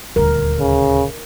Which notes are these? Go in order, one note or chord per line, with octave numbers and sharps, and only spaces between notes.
D#1 D2 A#4
C#3